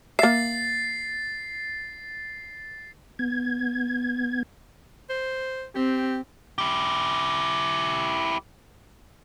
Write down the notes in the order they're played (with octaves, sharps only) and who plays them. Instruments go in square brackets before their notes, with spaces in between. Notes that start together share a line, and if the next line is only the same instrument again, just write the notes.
[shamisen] A#3 E5 [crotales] A6 C7
[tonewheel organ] B3 G#6
[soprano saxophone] C5
[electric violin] C4 [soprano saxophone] G4
[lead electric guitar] E4 G4